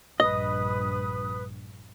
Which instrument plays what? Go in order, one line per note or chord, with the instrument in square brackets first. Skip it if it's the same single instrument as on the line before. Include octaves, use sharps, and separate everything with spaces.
[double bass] A#1 G2 [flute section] B4 D#6 [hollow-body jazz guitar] D#5